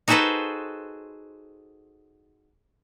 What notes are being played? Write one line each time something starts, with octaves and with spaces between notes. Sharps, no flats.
D#4 F#4 G#4 A4 B4 C5